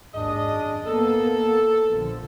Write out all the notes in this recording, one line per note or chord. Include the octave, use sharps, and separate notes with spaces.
G#1 D#2 D4 G#4 D#5
F#2
A#3 B3 A4
A#1 D3 F3